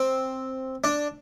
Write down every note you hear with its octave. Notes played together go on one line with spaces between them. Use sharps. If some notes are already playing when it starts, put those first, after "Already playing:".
Already playing: C4
D4